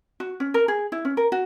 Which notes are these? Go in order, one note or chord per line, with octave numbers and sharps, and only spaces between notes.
F#4
C#4
A#4
G#4
E4
C#4
A#4
F#4